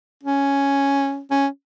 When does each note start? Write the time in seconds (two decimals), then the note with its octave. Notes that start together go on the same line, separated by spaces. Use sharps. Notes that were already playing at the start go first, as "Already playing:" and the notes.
0.23 C#4
1.31 C#4